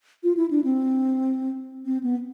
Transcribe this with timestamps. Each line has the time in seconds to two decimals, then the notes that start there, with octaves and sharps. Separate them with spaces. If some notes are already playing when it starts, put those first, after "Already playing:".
0.24 F4
0.37 E4
0.51 D4
0.64 C4
1.85 C4
2.03 B3